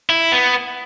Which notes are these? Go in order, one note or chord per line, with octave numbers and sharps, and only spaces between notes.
E4
B3